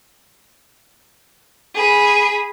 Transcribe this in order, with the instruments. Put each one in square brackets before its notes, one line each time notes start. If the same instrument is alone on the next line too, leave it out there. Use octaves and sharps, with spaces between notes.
[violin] G#4 B5